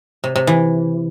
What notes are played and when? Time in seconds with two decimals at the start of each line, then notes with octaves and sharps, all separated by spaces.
0.24 C3
0.36 C3
0.47 E3